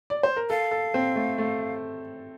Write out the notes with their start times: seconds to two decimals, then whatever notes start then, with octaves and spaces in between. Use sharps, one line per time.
0.10 D5
0.23 C5
0.36 A#4
0.50 A4 F5
0.71 A4
0.94 C4
1.16 A3
1.38 A3